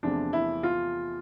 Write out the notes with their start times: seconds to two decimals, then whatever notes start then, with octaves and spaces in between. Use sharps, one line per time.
0.03 E2 C3 F3 A3 D4
0.33 E4
0.63 F4